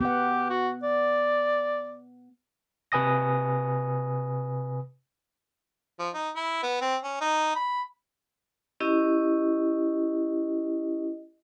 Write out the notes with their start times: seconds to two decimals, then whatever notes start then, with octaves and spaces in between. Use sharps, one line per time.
0.01 B3 G4 F#5
0.50 F#4
0.83 D5
2.92 C3 B4 G#5 D#6 A#6
5.99 F3
6.14 D#4
6.36 E4
6.63 B3
6.82 C4
7.04 C#4
7.21 D#4
7.56 B5
8.80 C#4 E4 G4 D#5